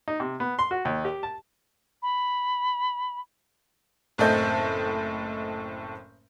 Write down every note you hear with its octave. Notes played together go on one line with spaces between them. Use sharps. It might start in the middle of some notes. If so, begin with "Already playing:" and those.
D#4
C3
B3
C6
F#4
D#2
G4
A5
B5
F#1 A2 C4 A4 D#5 G6